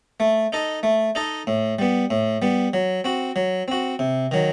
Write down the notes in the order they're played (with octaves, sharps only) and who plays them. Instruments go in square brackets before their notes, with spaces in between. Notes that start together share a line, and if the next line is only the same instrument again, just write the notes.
[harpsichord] A3
D#4 A4 D#5
A3
D#4 A4 D#5
A2
G3 B3
A2
G3 B3
F#3
C4 F#4
F#3
C4 F#4
C3
D#3 F#3